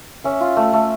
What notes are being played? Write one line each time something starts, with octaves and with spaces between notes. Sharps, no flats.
C#4 E5
F4
A3
A3